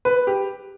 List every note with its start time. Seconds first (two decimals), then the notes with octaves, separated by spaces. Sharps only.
0.05 B4
0.27 G4